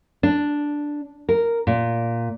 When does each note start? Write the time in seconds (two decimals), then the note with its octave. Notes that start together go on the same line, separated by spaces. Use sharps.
0.23 D4
1.29 A#4
1.67 A#2